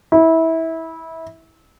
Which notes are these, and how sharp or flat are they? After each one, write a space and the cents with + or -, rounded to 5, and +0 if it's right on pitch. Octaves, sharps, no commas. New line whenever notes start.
E4 -20